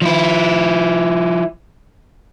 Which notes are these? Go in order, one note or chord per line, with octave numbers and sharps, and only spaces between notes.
F3 E4